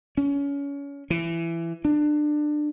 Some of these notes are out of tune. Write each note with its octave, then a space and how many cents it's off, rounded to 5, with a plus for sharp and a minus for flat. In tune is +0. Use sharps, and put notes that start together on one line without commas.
C#4 +30
E3 +20
D4 +25